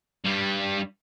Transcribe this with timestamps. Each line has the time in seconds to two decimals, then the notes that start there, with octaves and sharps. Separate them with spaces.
0.24 G2 G3